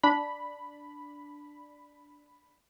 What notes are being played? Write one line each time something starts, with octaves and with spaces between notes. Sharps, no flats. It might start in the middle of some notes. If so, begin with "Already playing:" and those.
D4 B5